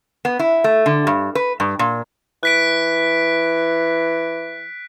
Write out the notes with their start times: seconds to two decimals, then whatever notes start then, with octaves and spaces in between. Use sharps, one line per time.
0.25 B3
0.39 E4
0.64 A3
0.86 D3
1.07 G2
1.35 B4
1.60 G2
1.79 A#2
2.43 E3 F#6 B6 D7